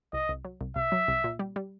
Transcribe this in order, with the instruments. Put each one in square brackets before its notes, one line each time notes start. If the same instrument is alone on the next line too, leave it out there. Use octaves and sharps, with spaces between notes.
[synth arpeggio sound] C2 [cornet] D#5
[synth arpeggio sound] C2
F#3
C2
[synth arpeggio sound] C2 [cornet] E5
[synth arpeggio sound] F#3
C2
A#2
G3
G3